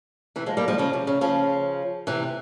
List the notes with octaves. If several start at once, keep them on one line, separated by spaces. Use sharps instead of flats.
C3 E3
F3 G#3
G3 A#3
F3 G#3
C#3 F3
C3
C#3
C#3 F3
C3 E3